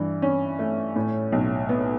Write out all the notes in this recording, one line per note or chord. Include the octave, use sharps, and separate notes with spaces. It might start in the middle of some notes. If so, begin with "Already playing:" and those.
Already playing: G2 E3
C#4
A3
A2
B1
B3